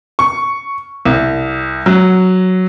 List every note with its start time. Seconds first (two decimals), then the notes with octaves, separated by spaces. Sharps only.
0.19 C#6
1.05 C2
1.86 F#3